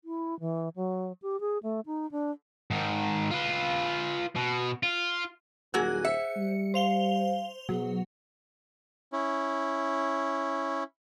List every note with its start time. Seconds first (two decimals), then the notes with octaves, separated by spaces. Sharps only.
0.05 E4
0.40 E3
0.76 F#3
1.22 G4
1.40 G#4
1.63 A3
1.86 D#4
2.11 D4
2.70 G#2 D#3
3.31 F4 B4
4.36 B2
4.83 F4
5.74 D#1 F#3 A#3 F#4 G#4 F#6
6.05 C5 E5 C#7
6.37 G3
6.74 C5 F5 F7 G7
7.69 B2 F#3 G#4
9.13 C#4 E4